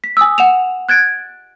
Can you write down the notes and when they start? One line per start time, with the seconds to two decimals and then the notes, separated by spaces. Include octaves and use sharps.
0.04 B6
0.17 G#5 D#6 E6
0.38 F#5 E7 F7
0.89 F#6 G#6 A6 D7